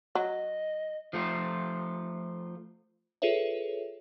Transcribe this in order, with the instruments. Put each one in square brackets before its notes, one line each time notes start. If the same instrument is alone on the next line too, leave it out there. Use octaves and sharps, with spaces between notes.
[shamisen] F#3 [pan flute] D#5
[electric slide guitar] F3 A3 F4
[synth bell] F4 G#4 A4 B4 C#5 E5